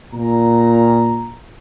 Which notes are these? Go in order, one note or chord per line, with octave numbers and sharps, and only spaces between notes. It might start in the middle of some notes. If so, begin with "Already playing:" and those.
A#2 A#5